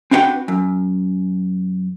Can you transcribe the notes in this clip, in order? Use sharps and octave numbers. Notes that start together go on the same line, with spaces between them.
C4 D4 E4 F#4 B4 G5
F#2